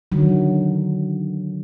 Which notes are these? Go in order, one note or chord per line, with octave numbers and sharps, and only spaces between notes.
D3 D#3 F#3